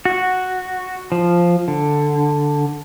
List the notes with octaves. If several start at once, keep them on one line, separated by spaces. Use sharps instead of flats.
F#4
F3
D3